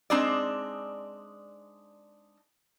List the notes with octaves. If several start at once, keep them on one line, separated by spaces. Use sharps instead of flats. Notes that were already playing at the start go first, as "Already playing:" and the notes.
G#3 C4 D4 D#4 D5